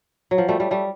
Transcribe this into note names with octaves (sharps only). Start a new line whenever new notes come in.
F#3
F3
G3 A3
G3 A3
G3 A3